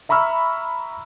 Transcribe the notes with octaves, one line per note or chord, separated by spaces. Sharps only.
E5 A#5 B5 C#6 E6 F6